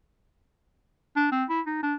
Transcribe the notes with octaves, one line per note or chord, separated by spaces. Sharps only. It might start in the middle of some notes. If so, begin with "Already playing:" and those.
D4
C4
E4
D#4
D4